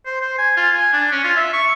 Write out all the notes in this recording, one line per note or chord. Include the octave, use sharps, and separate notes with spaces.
C5
C5
G#5
F4
G#5
D4
C#4
F4
E5
C#6